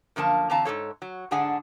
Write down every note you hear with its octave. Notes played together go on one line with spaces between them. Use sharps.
F#2 D3 F3 A#3 A5
D3 E3 C4 F5 A5 A#5
G#2 G#3 A4 C#5
F#3
G#2 D3 D4 G#4 F#5 G#5